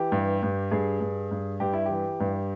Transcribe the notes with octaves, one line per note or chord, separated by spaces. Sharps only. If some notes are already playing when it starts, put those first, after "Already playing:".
Already playing: E3 G4
G2
G2
G2 G#4
G2
G2
G2 G4
E4
E3 G4
G2